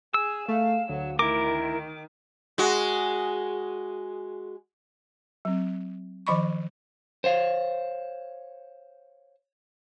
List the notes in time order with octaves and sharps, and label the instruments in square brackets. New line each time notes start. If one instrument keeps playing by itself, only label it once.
[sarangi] G#4 [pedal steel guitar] E6
[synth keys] A3 [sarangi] F5
[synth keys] D2 [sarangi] F#3
[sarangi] D#3 [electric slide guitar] E4 A#4 [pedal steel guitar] D6
[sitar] G#3 F#4
[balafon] F#3 C4
D#3 F3 D#5 B5 C#6
[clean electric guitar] C5 C#5 F5